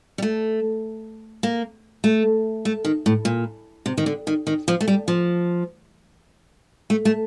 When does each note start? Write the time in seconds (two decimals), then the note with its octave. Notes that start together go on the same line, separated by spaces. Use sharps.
0.18 G3
0.22 A3
1.43 A#3
2.04 A3
2.65 A3
2.85 D#3
3.06 A2
3.25 A#2
3.86 C3
3.98 D#3
4.06 D3
4.27 D#3
4.47 D#3
4.68 F3
4.81 A3
4.88 G3
5.08 F3
6.90 A3
7.05 A3